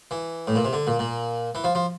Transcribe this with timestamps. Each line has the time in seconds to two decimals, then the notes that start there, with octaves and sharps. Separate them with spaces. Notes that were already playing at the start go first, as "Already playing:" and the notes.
0.11 E3
0.47 A2
0.56 A#2
0.65 C3
0.73 D3
0.87 A#2
0.99 A#2
1.55 E3
1.64 F3
1.75 F3